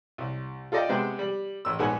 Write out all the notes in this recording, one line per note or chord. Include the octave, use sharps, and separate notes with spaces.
C2
F4 A4 D5 D#5 G5
C3 G#3 B3 C5 G5
G3
A1 E6
A#1 G#2 B3 A4 F#5 G#5